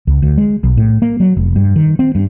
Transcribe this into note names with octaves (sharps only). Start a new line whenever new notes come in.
C#2
D2
G#3
B1
A2
A#3
F#3
F1
G2
D#3
C4
G2